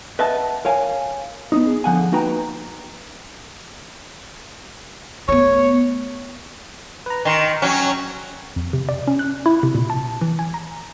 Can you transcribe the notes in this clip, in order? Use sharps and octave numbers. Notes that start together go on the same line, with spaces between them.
B4 D#5 E5 F#5 A5
A#4 C#5 F5 G#5
B3 D#4
G#4
D3 F3 F#5 G#5
A#3 D#4 F#4 B4 G5 A#5
A3 B3 C#5
B4 A#5
D#3 A#5 C6 C#6
F#3 C#4 F#5 G5
F2
C3
D5
C#4
F#6
E4
C3
A#2
A5
E3
G#5
A#5